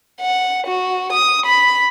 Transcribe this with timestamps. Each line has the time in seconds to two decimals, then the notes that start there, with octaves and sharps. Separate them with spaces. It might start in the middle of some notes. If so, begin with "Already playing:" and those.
0.21 F#5
0.67 F#4
1.12 D#6
1.46 B5